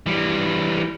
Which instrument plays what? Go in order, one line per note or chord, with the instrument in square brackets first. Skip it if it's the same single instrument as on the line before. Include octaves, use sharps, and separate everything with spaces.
[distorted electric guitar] E3 G3